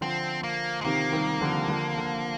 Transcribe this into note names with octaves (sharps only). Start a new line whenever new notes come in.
D3 F3 C4
A#3
G#3
C3 D#3 A#3
D#3 G3
D3 F3
D3 F3
D3